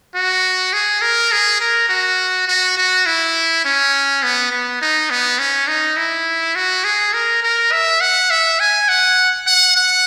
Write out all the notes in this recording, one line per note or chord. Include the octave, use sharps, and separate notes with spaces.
F#4
G#4
A#4
G#4
A#4
F#4
F#4
F#4
E4
C#4
B3
B3
D#4
B3
C#4
D#4
E4
F#4
G#4
A#4
A#4
E5
F#5
E5
G#5
F#5
F#5
F#5